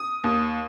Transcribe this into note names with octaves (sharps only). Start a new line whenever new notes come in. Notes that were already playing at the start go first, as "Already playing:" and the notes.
Already playing: D#6
D#2